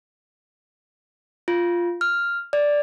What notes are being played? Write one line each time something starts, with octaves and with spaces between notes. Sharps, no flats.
F4
F6
D5